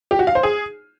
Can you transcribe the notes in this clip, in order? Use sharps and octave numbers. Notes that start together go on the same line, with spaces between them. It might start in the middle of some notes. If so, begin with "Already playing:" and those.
G4
F#4
F5
C5
G#4